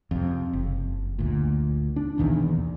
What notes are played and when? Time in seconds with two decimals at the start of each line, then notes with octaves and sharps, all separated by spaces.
0.11 F2 C3
0.53 F#1
1.19 D2 A#2
1.96 D4
2.18 B1 E2 A#2 D#3